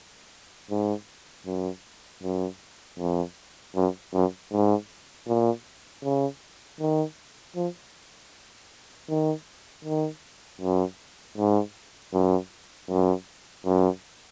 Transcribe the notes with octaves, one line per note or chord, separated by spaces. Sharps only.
G#2
F#2
F#2
F2
F#2
F#2
G#2
A#2
C#3
D#3
F3
D#3
D#3
F#2
G#2
F#2
F#2
F#2